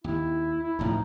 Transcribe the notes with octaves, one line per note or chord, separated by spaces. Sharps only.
D#2 E4
E4
D2 A2 F3 D#4